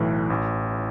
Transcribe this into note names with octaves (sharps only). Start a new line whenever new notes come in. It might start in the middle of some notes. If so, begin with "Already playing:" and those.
Already playing: B1 A2 E3
A1